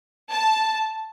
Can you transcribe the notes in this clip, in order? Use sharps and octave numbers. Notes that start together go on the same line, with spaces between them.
A5